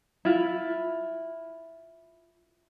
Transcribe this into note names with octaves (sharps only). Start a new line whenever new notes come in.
E4 F4